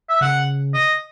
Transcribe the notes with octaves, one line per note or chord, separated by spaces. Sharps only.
E5
C#3 F#5
D#5